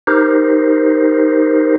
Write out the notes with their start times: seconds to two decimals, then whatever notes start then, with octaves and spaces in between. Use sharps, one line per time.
0.07 D#4 G4 A#4 C5